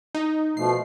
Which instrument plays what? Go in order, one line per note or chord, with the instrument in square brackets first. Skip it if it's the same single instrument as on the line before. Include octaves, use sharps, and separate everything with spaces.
[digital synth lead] D#4
[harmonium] B2 F3 A3 [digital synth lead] C7